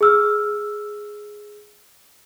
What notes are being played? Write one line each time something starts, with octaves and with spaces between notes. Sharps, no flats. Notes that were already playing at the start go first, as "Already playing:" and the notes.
G#4 E6 F6